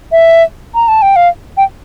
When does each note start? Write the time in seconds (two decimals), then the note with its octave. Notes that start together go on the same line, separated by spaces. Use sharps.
0.12 E5
0.75 A#5
0.88 A5
1.02 G5
1.16 F5
1.57 G5